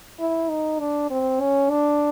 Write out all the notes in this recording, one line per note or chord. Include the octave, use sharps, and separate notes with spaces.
E4
D#4
D4
C4
C#4
D4